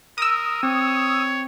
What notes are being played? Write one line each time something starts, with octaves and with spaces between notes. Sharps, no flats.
A#4 D#6 E6
C4 C#5